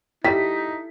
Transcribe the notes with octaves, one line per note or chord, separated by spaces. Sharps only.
G3 D#4 E4 A4 B6